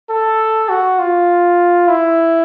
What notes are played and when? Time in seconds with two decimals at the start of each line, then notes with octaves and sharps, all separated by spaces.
0.10 A4
0.69 F#4
0.99 F4
1.88 E4